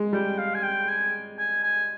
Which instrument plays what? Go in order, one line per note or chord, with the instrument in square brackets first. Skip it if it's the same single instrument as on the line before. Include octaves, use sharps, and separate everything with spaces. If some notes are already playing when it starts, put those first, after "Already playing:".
Already playing: [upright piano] G#3
[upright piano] G3 [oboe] G5
[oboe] F5
G#5
G5
G#5
G#5
G#5